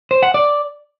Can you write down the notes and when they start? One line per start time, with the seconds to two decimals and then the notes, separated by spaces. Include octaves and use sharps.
0.11 C5
0.23 F#5
0.34 D5